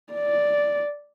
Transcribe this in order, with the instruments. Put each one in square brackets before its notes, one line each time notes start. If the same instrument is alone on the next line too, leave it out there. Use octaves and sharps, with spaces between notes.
[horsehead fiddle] D5